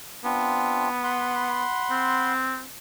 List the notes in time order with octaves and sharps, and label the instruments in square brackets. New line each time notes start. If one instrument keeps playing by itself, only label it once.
[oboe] B3 [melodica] C4 D4 F4
[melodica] F#5 B5 C6
[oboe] C4